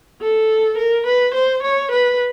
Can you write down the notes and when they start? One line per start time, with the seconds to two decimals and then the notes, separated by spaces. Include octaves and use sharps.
0.21 A4
0.78 A#4
1.06 B4
1.35 C5
1.63 C#5
1.91 B4